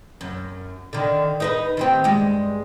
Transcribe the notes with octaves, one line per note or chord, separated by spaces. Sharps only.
F#2
D3 D#3
D#4 A#4 B4
D#3 C4 G4
G2 G#3